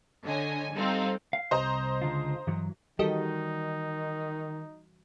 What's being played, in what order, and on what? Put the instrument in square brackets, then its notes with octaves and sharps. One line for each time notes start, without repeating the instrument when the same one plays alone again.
[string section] D3 C#5 D#5 G#5
G3 C4 D#4 A4 F5
[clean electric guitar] F5
[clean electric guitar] C2 [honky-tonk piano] C5 D#5 A#5
[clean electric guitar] C#2 D3 F4
G2 E3 F#3
[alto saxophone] D#3 [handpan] E3 G3 F#4 [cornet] D#4 [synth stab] G4 A4 D#5